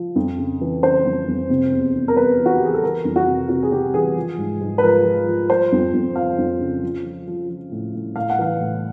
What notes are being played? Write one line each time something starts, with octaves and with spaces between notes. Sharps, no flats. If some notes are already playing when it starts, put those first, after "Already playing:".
Already playing: F3
F2
C#3
E3
C#3 C5
F2
F2
C3
E2
E2
A#4
E2 B4
E3
F#4
G4
E3 G#4
A4
E3 A#4
F2
F#4
C3
C3 F#4
G#4
C3 G4
E3 G#4
F3
G#2
G#2
B4
F3 A#4
F3
F3
F3 C5
F2
F2
F3 F5
F2
C#3
F3
F3
F3
F3
A2
A2
A2 F5
F#5
E3 F5
A2